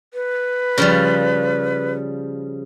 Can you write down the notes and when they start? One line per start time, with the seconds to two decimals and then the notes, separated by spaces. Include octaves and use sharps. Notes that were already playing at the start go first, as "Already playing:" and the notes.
0.14 B4
0.78 C#3 F3 G3